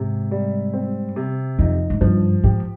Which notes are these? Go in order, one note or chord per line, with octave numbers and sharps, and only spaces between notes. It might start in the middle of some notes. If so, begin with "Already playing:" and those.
Already playing: G#2 C3
G3
C4
C3
F2 D#4
G#2
G2 F3
G#2 G4